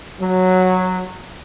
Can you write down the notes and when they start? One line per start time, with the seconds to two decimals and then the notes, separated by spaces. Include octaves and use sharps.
0.21 F#3